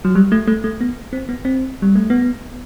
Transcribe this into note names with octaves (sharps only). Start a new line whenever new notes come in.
F#3
G3
A3
A3
A3
B3
C4
B3
C4
G3
A3
B3